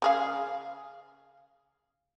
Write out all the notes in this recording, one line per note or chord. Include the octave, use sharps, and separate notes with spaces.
C#3 G#4 F5